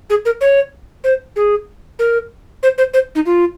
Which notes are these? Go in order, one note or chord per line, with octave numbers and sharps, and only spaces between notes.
G#4
A#4
C#5
C5
G#4
A#4
C5
C5
C5
D#4
F4